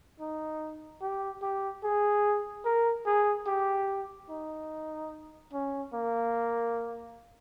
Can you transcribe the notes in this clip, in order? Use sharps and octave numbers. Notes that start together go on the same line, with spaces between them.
D#4
G4
G4
G#4
A#4
G#4
G4
D#4
C#4
A#3